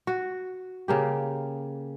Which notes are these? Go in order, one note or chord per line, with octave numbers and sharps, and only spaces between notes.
F#4
C#3 A#3 G4